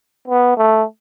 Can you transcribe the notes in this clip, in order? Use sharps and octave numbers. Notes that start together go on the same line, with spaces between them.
B3
A3